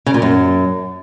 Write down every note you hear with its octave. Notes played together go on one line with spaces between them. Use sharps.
C#3
A#2
F#2